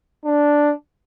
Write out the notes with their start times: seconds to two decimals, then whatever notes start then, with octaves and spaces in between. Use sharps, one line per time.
0.25 D4